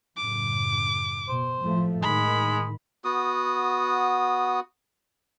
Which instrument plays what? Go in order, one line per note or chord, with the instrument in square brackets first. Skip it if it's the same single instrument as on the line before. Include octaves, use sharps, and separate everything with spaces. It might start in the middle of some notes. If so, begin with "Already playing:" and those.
[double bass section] F#2 A2 C#3 [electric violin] D6
[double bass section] B2 [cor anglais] C5
[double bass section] A2 F3 A3
[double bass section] A2 D#3 [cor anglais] G#3 [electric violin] B5
[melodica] B3 F#4 D#6